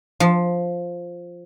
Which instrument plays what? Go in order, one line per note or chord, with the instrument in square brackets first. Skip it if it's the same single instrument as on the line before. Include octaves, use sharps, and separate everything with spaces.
[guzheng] F3